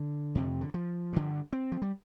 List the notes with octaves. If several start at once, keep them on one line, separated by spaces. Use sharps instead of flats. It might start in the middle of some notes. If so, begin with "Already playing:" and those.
Already playing: D3
F2 C3
D3
F3
G2 D3
C4
F3
G3